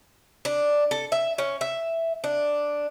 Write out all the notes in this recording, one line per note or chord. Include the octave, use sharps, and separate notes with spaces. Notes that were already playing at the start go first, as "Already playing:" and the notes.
D4
A4
E5
C#4
E5
D4